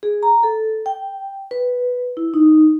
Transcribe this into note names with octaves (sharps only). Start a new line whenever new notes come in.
G#4
A#5
A4
G5
B4
E4
D#4